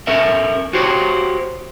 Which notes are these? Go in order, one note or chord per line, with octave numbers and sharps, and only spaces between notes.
C#4 A4 A#4 E5
F#4 G4 C5 C#5